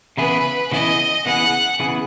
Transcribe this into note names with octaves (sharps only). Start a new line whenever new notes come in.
C#3 E3 B3 E4 G#4 B4
C#3 E3 B3 E4 G#4 D#5
C#3 E3 B3 E4 G#4 F#5
C#3 E3 B3 E4 G#4